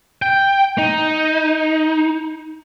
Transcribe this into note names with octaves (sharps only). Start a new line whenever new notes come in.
G5
D#4